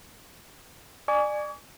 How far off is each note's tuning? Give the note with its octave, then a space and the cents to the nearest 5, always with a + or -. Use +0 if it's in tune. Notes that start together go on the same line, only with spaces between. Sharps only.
D5 +30 G#5 +0 C#6 +45